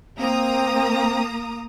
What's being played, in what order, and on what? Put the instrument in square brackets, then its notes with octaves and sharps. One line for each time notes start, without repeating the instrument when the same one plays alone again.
[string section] A#3 A#5 D#6 [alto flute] C4